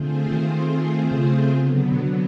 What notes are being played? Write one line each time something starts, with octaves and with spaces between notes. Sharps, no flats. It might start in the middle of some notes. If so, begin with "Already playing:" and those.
Already playing: D3 A3 C4 F4 G#4 C5
D#3
C#3
D3 F#3 B3
C3